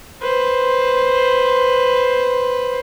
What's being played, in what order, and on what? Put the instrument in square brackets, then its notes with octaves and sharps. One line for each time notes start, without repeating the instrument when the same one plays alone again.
[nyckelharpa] B4 C5